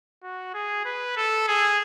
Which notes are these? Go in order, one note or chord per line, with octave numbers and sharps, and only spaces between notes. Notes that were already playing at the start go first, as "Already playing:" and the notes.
F#4
G#4
B4
A4
G#4